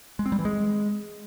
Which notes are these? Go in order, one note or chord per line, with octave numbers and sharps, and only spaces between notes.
G#3
C4
G3
E3
G#3